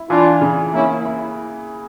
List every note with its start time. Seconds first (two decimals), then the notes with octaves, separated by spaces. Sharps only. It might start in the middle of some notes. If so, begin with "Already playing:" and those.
Already playing: E4
0.10 E3 D4 F4
0.42 C#3
0.73 A#3 C#4 E4
1.05 E4